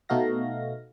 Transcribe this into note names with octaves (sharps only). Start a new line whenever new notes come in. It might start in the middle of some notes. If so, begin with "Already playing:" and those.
B2 A3 D#4 F#4 F5 A#6